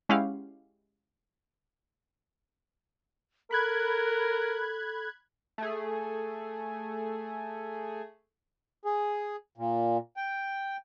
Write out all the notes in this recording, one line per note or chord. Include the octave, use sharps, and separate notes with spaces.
G#3 C#4 E4 G4 F5 F#5
A4 A#4 B5 F#6 G#6
A3 G#4
G#4
A#2
G5